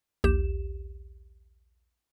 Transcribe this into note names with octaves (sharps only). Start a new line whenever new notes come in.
A#1 D#2 G4 E7